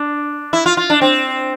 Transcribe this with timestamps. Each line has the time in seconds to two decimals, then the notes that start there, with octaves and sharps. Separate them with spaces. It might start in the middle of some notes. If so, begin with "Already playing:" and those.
Already playing: D4
0.53 E4
0.66 F4
0.77 F4
0.90 D4
1.01 C4